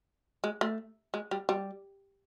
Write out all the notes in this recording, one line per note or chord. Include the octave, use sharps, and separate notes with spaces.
G#3
A3
G#3
G3
G3